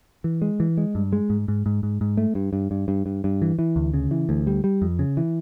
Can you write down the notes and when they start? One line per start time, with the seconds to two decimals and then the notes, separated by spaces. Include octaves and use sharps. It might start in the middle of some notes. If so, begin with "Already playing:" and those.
0.24 E3
0.42 G#3
0.60 E3
0.77 G#3
0.95 G2
1.12 G#3
1.30 G#2
1.48 G#2
1.66 G#2
1.83 G#2
2.01 G#2
2.17 A3
2.35 G2
2.53 G2
2.71 G2
2.88 G2
3.06 G2
3.24 G2
3.42 E3
3.59 E3
3.76 D2
3.94 C#3
4.11 E3
4.29 D2
4.47 G3
4.64 G3
4.82 F2
4.99 C#3
5.17 E3